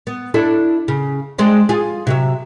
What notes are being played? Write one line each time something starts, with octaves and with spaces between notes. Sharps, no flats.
B3
D4 E4 A4
C#3
G#3 C4 D4
F4 G#4
C3 F#3 E5